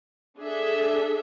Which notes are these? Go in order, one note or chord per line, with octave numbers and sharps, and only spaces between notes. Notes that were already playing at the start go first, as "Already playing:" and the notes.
D4 G#4 A4 E5